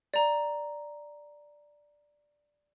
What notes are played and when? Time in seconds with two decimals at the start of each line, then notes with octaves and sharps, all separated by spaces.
0.14 D5 A#5